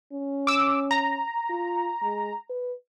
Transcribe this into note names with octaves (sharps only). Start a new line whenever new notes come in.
C#4
D6 E6
A#5
F4
G#3
B4